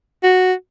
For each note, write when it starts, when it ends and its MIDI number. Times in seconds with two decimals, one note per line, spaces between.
0.23 0.53 66